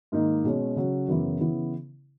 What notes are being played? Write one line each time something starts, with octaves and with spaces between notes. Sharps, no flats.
G#2 D#3 A#3 D#4
B2 G#3 C#4
C#3 F#3 C#4
F#2 C#3 E3 B3 E4
C#3 E3 B3 E4